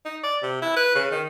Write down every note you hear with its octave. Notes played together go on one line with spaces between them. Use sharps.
D#4
D5
C3
E4
B4
C#3
D#3